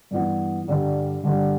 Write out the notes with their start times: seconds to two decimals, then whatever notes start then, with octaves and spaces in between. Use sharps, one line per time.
0.11 G2 E3 B3
0.68 G2 D3 G3
1.23 G2 D3 G3